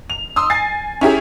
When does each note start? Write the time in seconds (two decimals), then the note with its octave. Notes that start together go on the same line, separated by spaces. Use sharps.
0.10 F7
0.36 C6 D#6 E6
0.50 G#5 A6 C7
1.01 C#4 E4 G4 G#4